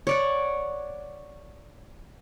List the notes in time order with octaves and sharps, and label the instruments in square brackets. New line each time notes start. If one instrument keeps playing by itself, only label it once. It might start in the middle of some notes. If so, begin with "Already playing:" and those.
[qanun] C#5 D5 F#5